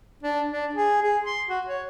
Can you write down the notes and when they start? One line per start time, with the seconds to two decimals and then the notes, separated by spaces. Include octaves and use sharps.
0.23 D4
0.52 D4
0.75 G#4
1.02 G#4
1.25 C6
1.49 F#4
1.67 C#5